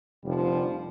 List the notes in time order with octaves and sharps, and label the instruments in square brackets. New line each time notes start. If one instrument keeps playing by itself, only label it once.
[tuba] F1 [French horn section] D3 F3 G3